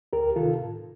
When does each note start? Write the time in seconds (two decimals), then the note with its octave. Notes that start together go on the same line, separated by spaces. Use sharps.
0.13 D2 G4 A#4
0.36 C3 D#3 F4 A4
0.59 A2